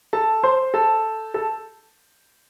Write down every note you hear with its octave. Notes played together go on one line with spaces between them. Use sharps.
A4 A5
C5 C6
A4 A5
A4 A5